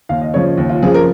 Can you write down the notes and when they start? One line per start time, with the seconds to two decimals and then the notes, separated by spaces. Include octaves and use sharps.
0.09 D#2 F5
0.21 D#5
0.34 C#3 F3 C#5
0.57 D#2
0.69 F4
0.82 C#3 F3 G#4
0.94 A#4